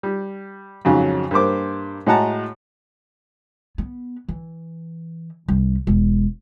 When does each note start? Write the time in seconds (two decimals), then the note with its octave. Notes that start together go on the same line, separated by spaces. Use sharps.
0.03 G3
0.85 F2 G#2 C#3 F#3
1.31 G2 A#3 C5 D6
2.07 A2 G#3 F#4 F#5 A5 A#5
3.78 B3
4.28 E3
5.48 C2
5.87 E1